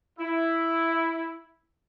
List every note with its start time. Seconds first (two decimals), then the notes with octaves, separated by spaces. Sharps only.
0.19 E4